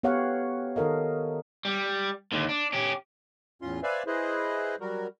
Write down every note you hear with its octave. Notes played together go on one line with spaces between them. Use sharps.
B3 G4 C#5 F5 F#5
D#3 D#4 A4 A#4 D#5 F5
G3
D#2 D3
D4
C#4 G4
E2 A2 C#4 F4 C6
B4 C5 D5 E5 F5 G#5
E4 G#4 B4 C5 D#5
F#3 G3 F#4 A#4